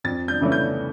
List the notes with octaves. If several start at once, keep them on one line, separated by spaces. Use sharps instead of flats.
F2 A6
G6
C#3 E3 A3 C#4
G6